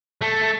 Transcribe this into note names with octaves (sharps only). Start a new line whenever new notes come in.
A3